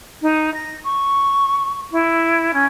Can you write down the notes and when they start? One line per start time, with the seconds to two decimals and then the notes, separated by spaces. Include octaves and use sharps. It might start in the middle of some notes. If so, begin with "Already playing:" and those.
0.22 D#4
0.54 A#6
0.84 C#6
1.91 E4
2.53 C#4